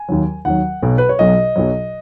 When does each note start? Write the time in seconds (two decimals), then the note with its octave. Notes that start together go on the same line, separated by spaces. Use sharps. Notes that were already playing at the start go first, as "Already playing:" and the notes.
Already playing: G#5
0.09 D#2 D#3 F#3
0.45 D#2 D#3 F#3 F#5
0.83 B1 B2 F#3
0.98 B4
1.09 C#5
1.19 B1 B2 F#3 D#5
1.56 B1 B2 F#3